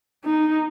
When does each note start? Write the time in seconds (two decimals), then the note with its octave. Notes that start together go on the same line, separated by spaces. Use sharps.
0.25 D#4